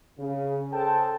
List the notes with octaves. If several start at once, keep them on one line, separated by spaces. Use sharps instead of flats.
C#3
G#4 A4 C5 G5 A5